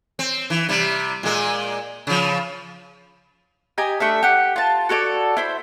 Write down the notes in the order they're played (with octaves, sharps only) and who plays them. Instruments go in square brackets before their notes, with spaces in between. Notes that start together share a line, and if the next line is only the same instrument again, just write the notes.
[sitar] C4
E3
C3 G3
A#2 G#3
C#3 F3
[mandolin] G4 D#5 G#5 A#5
A3 D4 E5
G4 F#5
F4 A5
F#4 A4 C#5 D5
E4 C5 B5